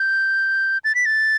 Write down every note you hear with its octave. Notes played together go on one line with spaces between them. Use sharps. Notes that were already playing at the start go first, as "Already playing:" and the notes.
Already playing: G6
A6
B6
A6